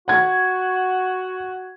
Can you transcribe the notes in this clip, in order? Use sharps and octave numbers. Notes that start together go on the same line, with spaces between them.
F#4 F#5 G#6